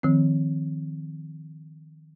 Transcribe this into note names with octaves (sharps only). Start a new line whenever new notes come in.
D#3 F3 C4